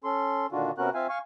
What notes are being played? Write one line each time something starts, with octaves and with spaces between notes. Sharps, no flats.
C#4 A4 C6
A#2 D3 D#3 D4 F4 F#4
C3 B3 C#4 F#4 A#4 F#6
C4 F4 E5 F5 G#5
F5 G#5 C#6